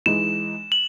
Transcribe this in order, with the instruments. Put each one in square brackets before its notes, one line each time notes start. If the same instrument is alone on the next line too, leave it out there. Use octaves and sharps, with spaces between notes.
[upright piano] E3 G#3 D#4 [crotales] E7
[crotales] F#7